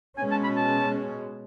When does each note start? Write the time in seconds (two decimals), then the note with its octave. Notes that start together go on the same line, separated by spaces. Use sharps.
0.18 B2 G#3 C#4 G#5
0.31 A5
0.44 B5
0.56 A5